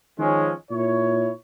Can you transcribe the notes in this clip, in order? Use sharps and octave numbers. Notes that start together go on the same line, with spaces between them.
D#3 F3 G#3 C#4
A#2 E4 C#5